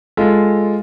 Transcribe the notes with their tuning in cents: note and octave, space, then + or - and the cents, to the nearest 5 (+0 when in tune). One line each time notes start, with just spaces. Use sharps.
G#3 +0 F4 +0 A4 +0